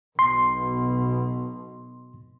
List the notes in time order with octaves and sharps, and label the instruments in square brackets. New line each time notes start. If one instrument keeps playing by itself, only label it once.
[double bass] B1 B2 [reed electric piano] C6